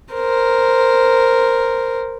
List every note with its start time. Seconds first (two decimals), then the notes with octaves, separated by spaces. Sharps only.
0.14 A#4 C5